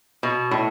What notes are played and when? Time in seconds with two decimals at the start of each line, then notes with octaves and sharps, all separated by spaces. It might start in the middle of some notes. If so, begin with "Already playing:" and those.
0.23 B2
0.51 A2